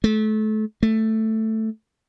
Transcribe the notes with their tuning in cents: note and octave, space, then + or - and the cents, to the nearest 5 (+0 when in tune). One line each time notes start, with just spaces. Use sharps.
A3 -30
A3 +5